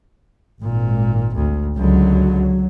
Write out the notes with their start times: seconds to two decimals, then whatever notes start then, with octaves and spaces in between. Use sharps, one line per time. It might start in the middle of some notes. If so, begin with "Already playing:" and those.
0.63 G#1 A#2
1.35 D2
1.77 C#2 D3 F#3